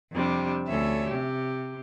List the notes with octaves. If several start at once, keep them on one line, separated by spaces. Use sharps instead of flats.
F2 C3 G3 D4
D2 C#4 A4 C#5 E5
C3 G4